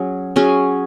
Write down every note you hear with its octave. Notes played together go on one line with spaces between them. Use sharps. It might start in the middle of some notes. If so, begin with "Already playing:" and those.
Already playing: F#3 C#4 G#4
F#3 C#4 G#4